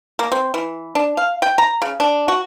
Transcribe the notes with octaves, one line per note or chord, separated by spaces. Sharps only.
A#3
C4
E3
D4
F5
G5
A#5
C#3
D4
F#4